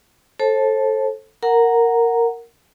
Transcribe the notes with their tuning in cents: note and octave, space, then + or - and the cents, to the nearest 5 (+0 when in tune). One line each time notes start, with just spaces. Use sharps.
A4 +0 C5 +40 A5 -10
A#4 -10 F#5 +0 A#5 +0